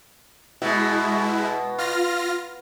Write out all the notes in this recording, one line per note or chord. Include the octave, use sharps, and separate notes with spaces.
B2 G#3 E4
F4 F6 A#6